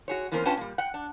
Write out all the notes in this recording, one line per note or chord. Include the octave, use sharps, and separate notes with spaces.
F#4 G#4 C#5
E3 A#3 B3 C#4 A#4 C5
C#4 D4 F4 B4 G5 A5
A#2 G3
F#5 G5
D4